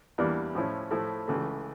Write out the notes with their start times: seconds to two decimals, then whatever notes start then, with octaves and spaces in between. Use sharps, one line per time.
0.18 E2 E3 G3 A#3 D4
0.55 A2 F3 C#4 E4
0.91 A2 F3 A3 E4
1.28 C#2 C#3 E3 A3